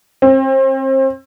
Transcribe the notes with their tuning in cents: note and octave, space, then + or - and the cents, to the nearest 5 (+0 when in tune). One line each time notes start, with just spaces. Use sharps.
C4 +35